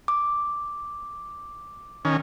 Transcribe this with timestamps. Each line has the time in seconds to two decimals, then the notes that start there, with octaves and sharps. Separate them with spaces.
0.08 D6
2.05 D#3 C#4